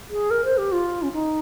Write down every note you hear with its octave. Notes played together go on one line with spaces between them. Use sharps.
G#4
A#4
C5
G4
F4
C#4
D#4